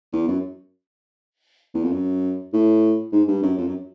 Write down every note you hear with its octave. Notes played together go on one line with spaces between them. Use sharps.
E2
F#2
E2
F2
F#2
A2
G#2
G2
F#2
F2
F#2